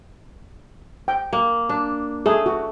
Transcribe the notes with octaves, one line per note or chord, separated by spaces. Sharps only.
G5
A#3
D4
A3 G#4
F#4